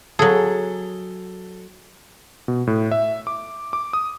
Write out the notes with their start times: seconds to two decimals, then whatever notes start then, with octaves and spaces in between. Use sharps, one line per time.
0.19 F#3 G#4 A4
2.48 B2
2.67 A2
2.91 E5
3.27 D6
3.73 D6
3.93 D#6